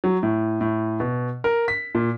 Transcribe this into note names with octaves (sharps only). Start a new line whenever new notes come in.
F#3
A2
A2
B2
A#4
B6
A#2